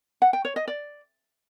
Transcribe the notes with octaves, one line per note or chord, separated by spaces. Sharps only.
F#5
G5
C#5
D#5
D5